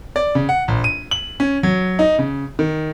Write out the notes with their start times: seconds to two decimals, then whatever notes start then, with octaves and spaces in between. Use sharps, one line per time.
0.16 D5
0.35 C#3
0.49 F#5
0.68 A#1
0.84 D#7
1.11 F#7
1.40 C#4
1.63 F#3
1.99 D#4
2.19 C#3
2.59 D#3